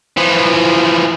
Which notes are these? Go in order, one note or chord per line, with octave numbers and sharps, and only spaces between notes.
E3 F3